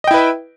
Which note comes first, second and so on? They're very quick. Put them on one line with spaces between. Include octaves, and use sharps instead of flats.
D#5 G5 E4 B4 E5